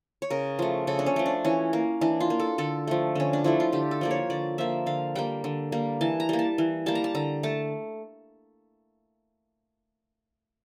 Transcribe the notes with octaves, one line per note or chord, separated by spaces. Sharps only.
C#5
C#3 A#4
F3 A3
C#3 A4
D4
C#4
F3 A3
D4
E3 C#4
A#3
E3 D4
F4
A#3
A4
D3 A4
F3 A3
D3 C#4
D4
F3 A3 E4
F4
D3 G4
A4
F3 A#3 D5
C#5
D3 D5
F3 A#3 E5
D3 F5
G3 A#3 G5
D3
G3 A#3
E3 A5
A#5
G3 A#3
A5
E3
G3 A#3 A5
A#5
A5
D3 A#5
A3 A5